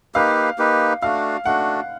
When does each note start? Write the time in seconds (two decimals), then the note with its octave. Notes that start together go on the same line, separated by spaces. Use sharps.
0.15 A#3 D#4 G4 B4 F5
0.58 A#3 D#4 G4 B4
1.02 A3 D4 F#4 F5
1.45 A3 D4 F#4 F#5